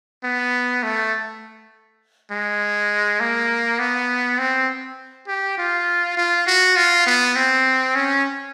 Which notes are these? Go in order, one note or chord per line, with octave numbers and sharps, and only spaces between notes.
B3
A3
G#3
A#3
B3
C4
G4
F4
F4
F#4
F4
B3
C4
C#4